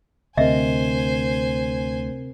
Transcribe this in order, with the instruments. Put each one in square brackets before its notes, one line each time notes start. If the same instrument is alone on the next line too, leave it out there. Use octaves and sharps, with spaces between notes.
[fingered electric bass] D2 [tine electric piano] C3 C4 A#4 [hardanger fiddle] C5 G#5 [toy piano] D#5 E5